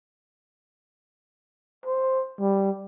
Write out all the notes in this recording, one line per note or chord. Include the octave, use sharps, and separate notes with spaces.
C5
G3